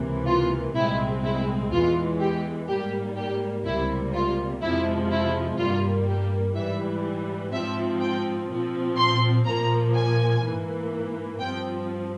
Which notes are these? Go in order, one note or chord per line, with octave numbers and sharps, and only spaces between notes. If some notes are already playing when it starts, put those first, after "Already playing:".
Already playing: C#2 C3 E3 A#3
F4
C2 A#2 G#3 C4 E4
E4
E2 E3 G#3 F4
G4
G#2 G3 A#3 G4
G4
C#2 C3 G3 A#3 E4
F4
F2 C3 F3 G#3 E4
E4
G2 G3 A#3 F4
G4
G#2 E3 G3 E5
G#2 F3 C4 E5
G5
A#2 F3 C4
C6
A#2 F3 A#3 A#5
G#5
G#2 E3 A#3
G2 F3 C4 G5